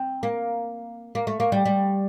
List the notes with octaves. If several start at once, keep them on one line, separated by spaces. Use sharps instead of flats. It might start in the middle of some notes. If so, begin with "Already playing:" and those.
Already playing: C4
A#3
A#3
A3
A#3
G3
G3